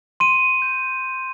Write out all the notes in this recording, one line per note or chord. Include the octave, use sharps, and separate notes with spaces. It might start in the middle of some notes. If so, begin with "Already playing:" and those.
C6 D#7
G6